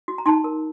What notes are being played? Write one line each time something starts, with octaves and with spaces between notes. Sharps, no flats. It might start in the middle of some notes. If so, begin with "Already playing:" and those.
F#4
A#5
D#4 A5 C6
A#4